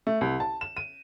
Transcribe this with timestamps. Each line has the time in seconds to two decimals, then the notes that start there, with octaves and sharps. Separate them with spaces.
0.07 A3
0.21 C2
0.40 A5
0.61 E7
0.77 D#7